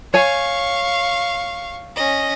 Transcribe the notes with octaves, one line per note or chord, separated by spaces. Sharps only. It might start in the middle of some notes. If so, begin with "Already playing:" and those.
C#5 F5 G#5 C#6
C#4 D#5